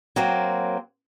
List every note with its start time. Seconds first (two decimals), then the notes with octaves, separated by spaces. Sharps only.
0.16 F#3 A#3 C4